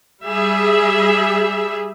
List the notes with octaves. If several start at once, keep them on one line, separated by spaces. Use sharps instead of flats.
G3 G#4 E5